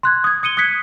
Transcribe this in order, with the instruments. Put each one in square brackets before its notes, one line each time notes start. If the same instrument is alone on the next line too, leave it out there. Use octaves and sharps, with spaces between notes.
[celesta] C6 F#6 G#6
D#6 G#6
D#6 C#7 D#7 G7
D#6 F#6 G#6 B6 C#7